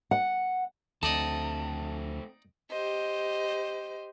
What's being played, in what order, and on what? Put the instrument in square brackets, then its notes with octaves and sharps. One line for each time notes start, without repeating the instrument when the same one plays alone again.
[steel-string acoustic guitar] F#5
[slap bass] D2 [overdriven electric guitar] A3 C4 [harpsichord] D#4 D5 D#5 [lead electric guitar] A5
[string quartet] G4 C5 D#5